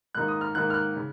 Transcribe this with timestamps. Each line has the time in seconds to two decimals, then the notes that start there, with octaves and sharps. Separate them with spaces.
0.15 G#2 D#3 A#3 D#4 F#6
0.28 D#6
0.41 F6
0.55 G#2 D#3 A#3 D#4 F#6
0.70 F6
0.74 F#6
0.96 C#3